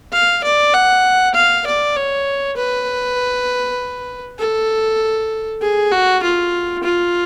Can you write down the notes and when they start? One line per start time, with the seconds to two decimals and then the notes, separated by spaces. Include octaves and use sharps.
0.13 F5
0.44 D5
0.74 F#5
1.35 F5
1.66 D5
1.96 C#5
2.57 B4
4.39 A4
5.62 G#4
5.91 F#4
6.23 F4
6.84 F4